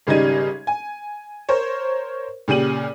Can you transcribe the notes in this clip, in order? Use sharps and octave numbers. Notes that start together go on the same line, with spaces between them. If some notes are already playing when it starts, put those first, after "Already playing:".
G#1 C#3 G3 D#4 G#6 D#7
G#5
A#4 C5 C#5
A#2 C#3 G4 D#7 F#7